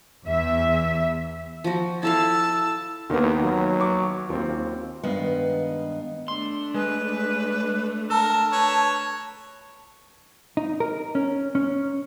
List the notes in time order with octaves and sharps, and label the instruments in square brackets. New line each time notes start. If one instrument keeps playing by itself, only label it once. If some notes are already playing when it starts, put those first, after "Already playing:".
[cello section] E2 E5
[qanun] F3 F#4
[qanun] E4 A4 F5 [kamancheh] A5 E6
[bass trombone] D#2 [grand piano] D#3 A#3 B3
[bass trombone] F#3
[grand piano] C#6 D6
[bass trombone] D#2 [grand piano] C4 F4
[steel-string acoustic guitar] G2 D#3 G#3 B3 F5
[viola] A3 D4 [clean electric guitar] C6
[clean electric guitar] G#3 [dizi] B4
[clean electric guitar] A4 [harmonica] A#4 [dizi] A5
[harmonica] B4 C#5
[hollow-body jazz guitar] D#4
A#4
C#4
C#4